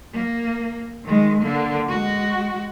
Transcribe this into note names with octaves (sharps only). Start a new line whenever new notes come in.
A#3
D#3 G#3
D3 A#3
G#3 F#4